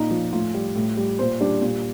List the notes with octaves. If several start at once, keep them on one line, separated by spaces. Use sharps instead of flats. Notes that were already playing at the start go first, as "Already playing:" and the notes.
Already playing: A#2 D#4
F3
A2 F4
G3
A2
G3
A#2 C5
G3 D4
A#2